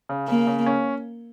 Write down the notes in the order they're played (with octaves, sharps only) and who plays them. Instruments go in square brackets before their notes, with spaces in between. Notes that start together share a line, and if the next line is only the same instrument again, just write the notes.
[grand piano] C#3
[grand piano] C#3 [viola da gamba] A#3
[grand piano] C#3
C#4